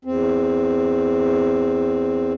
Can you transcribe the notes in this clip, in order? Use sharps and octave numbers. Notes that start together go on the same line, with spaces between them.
E2 C4